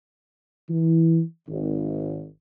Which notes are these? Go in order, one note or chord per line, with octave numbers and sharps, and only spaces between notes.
E3
G#1